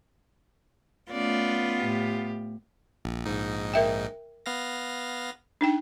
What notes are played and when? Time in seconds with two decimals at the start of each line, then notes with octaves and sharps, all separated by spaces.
1.11 A3 B3 C#4 F4 D5
1.76 A2 G4
3.05 A#1
3.26 A#1 G#2 D#4
3.74 A#4 E5 G5
4.46 B3 F5 A#6
5.61 D4 D#4 G5